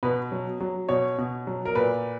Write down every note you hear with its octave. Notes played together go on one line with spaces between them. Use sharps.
B2 B4
F#3
F#3
B2 C#5
B2
F#3
A#4
A#2 B4